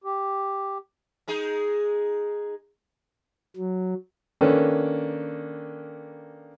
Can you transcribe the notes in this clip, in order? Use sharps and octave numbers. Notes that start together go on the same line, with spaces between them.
G4
G#3 D#4 G#4
F#3
D#3 A#3 C#4 D4 A4 B4